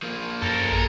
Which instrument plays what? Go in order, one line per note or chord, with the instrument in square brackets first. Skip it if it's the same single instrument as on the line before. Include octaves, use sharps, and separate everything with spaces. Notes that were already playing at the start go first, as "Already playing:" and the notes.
[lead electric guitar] F3 A#3
[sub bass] F#2 [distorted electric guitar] A4 A#4
[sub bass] A1 [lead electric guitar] G#4